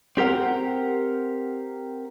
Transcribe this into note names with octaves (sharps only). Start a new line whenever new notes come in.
C4 G4 A#4 F#5